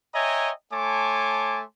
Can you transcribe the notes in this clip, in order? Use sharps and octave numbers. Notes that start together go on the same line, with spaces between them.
C#5 D#5 E5 G5 G#5 A#5
A3 C#5 G#5 A5 C6 D6